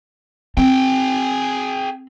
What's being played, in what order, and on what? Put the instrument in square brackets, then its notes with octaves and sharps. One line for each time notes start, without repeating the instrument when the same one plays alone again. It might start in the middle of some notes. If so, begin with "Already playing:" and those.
[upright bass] C4 [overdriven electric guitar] G#4 G5